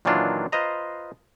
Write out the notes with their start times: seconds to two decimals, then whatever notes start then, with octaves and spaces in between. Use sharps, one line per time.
0.05 A#2 D#3 E3 F#3 D4 F4
0.52 F4 B4 C5 D#5 A#5